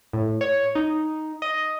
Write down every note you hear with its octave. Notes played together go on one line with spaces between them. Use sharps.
A2
C#5
D#4
D#5